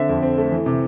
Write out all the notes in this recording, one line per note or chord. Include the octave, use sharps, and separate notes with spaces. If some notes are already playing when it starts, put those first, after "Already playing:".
Already playing: D3 C4 E5
F2
C4
A3
E3
C3